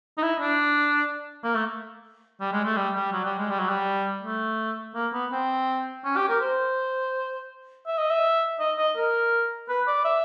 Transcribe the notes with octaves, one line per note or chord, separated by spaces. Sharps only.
D#4
E4
D4
A#3
A3
G3
G#3
A3
G3
G3
F#3
G3
G#3
G3
F#3
G3
A3
A#3
B3
C4
C#4
G4
A#4
C5
E5
D#5
E5
D#5
D#5
A#4
B4
D5
E5